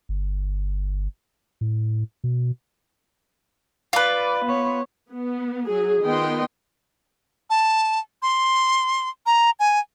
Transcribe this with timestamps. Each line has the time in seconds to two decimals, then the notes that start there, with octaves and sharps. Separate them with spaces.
0.09 G1
1.61 A2
2.24 B2
3.93 F4 B4 D5
4.45 B3 C#5
5.09 B3
5.67 F#3 G#4
6.02 D#3 B3 F4 D#5 G5 C6
7.50 A5
8.22 C6
9.26 A#5
9.60 G#5